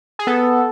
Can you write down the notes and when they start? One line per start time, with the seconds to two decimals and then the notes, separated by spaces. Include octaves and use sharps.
0.19 G#4
0.27 B3 A4